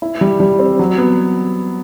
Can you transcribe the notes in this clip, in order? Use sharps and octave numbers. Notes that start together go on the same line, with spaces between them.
E4
G3
G3
C4
F#3
B3